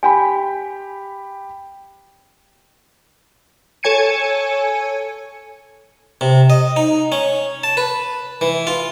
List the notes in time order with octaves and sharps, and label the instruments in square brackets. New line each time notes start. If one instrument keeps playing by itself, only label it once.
[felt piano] G4 G5 B5 [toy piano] G#5
[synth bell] A4 C#5 G#5 G#6 C#7 D#7
[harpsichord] C3
D#5
D#4
C#4
A5
B4
E3
F4